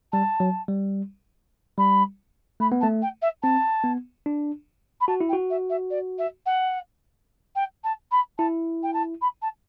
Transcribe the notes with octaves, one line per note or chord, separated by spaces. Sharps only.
G3 A5
F#3
G3
G3 B5
A3 B5
B3
A3 A5
G5
E5
C4 A5
B3
D4
B5
F#4 A5
E4
G5
F#4
E5
E5
D5
E5
F#5
G5
A5
B5
E4 A5
G5
A5
B5
A5